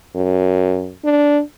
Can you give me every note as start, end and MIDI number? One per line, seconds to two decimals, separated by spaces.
0.15 0.93 42
1.04 1.41 62